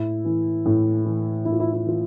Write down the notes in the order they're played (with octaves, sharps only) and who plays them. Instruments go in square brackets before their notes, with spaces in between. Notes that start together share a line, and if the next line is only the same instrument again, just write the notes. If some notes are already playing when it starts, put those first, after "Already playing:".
Already playing: [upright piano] A2 E4
E3
A2
E3
A2 E4
F4
E4
E4
E3 F4